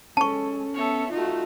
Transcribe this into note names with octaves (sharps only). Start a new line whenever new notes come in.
G#3 C#4 A4 A5 C#6
B3 A4 C#5 E5
A3 D#4 F4 F#4